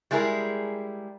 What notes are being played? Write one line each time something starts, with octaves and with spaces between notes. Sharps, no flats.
G3 G#3 E4 G#4 A#4